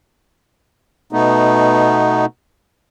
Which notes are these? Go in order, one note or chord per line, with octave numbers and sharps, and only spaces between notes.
B2 A3 B3 D#4